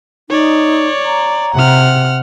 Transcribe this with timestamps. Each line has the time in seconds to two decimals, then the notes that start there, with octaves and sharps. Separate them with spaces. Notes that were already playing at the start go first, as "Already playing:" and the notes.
0.30 D#4 C#5 D5
1.05 A#5
1.55 C3 F#5 F6